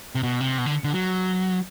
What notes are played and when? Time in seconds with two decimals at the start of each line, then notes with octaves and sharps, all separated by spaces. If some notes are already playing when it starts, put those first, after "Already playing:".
0.15 C3
0.23 B2
0.41 C3
0.58 B2
0.66 D3
0.84 D3
0.93 F#3